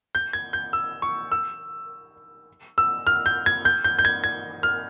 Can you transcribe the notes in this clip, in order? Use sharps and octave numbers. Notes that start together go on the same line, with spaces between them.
G6
G#6
G6
E6
C#6
E6
E6
F6
G6
G#6
G6
G6
G6
G#6
G#6
F6